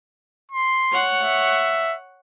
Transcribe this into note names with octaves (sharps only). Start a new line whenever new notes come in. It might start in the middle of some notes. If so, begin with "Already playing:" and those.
C6
C#5 F#5
E5